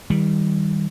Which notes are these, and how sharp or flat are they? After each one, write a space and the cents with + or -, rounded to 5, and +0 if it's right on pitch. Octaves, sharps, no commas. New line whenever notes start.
D#3 +30 G3 +0